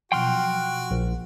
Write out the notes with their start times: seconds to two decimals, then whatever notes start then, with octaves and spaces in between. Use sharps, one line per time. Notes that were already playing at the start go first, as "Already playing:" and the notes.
0.12 B2 F3 F#3 F#4 G5 C6 F6
0.91 A#1